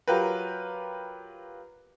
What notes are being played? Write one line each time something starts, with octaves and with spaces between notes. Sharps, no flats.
F#3 F4 G4 A#4 B4